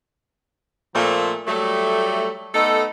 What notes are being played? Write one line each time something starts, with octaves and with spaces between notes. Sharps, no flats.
A#2 F3 A3 A#3 C4
F#3 G3 A3
A3 B3 D#4 A4